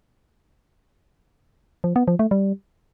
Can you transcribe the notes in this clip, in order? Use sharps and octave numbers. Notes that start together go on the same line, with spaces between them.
F3
B3
F3
A3
G3